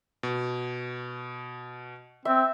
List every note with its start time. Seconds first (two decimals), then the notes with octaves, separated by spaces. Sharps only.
0.23 B2
2.25 C4 E5